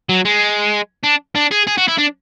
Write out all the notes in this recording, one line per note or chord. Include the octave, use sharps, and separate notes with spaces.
F#3
G#3
D4
D4
G#4
G#4
F#4
E4
D4